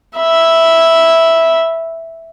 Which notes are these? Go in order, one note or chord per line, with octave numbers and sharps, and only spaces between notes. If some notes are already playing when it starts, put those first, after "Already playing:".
E5 B5